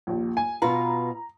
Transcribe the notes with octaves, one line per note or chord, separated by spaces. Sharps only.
A#1 D#2
G#5
B2 F4 B4 A#5